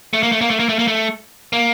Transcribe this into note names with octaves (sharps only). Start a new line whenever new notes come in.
A3
A#3
A3
A#3
A3
A#3
A3
A#3
A3
A#3